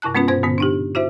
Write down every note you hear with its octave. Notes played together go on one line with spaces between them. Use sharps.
G2 C3 E4 A5 F#6
G#3 B3 C#4 F4 B4
G2 B2 C5 G#6
G2 A#2 D3 B3
D4 D#4 G4
E4 F#4 C5 E5